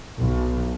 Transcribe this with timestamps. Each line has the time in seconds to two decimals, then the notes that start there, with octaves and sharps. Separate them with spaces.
0.18 B1